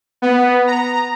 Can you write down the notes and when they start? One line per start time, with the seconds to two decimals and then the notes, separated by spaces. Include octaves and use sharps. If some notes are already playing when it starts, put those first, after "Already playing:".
0.22 B3
0.67 A#5